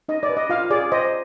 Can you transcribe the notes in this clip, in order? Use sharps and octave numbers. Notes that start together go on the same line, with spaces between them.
D#4 D#5
D5
B4
D#5
F4 F5
G#4 D5
C5 D#5